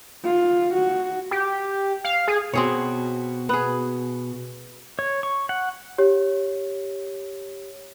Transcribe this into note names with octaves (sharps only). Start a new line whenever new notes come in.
F4
F#4
G4
F5
G#4
B2 C4 F#4 G#4 C#5
B3 G#4
C#5
C#6
F#5
G4 C#5